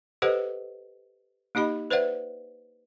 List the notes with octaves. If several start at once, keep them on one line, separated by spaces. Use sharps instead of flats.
G4 A4 B4 C5 D#5 F#5
A#3 D#4 G4 D#5 B5
B4 C5 D5 E5 F#5